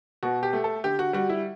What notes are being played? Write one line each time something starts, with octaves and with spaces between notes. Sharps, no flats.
B2 F#4
G4
A3
A4
D3 G4
F#4
G3 F#4
E4